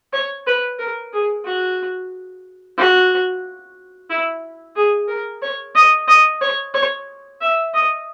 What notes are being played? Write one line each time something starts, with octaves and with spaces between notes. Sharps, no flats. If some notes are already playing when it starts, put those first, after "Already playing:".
C#5
B4
A#4
G#4
F#4
F#4
E4
G#4
A#4
C#5
D#5
D#5
C#5
C#5
E5
D#5